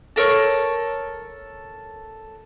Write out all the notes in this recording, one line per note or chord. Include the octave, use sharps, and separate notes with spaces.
A4 A#4 C#5